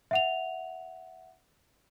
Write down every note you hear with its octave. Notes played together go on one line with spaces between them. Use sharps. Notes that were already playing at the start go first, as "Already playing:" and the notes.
E5 F#5 F7